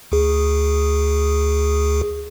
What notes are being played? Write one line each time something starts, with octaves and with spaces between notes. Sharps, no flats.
D2 G#4